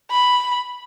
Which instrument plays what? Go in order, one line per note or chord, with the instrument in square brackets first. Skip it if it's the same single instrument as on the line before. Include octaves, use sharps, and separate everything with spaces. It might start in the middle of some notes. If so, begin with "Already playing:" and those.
[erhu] B5